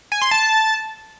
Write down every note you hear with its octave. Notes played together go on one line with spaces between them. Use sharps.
G#5
C6
A5